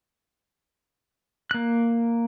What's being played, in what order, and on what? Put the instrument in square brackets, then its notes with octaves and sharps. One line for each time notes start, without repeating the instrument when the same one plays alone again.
[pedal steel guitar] A#3 F#6